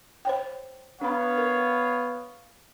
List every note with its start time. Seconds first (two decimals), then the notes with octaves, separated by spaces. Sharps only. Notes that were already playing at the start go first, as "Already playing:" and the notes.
0.25 C5 C#5 G5
1.01 B3 D4 C#5 F5 B5
1.38 A#4